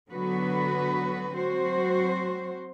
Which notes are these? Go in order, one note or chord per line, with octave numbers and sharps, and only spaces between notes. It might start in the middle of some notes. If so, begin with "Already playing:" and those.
D3 F#3 B3 F#4 B4
F#3 C4 F#4 C5